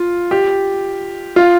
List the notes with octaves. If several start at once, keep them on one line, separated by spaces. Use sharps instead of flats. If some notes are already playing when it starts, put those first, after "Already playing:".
Already playing: F4
G4
F4